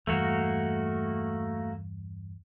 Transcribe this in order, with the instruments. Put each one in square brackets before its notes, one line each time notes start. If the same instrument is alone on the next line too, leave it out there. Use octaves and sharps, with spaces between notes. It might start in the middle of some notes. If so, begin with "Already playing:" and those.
[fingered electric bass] E2 G2 [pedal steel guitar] A3 A#3 F#4